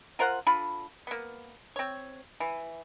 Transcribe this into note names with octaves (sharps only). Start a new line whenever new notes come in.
F4 A#4 C5 F#5
D3 F4 B5
A#3 B3
C4 C#5
E3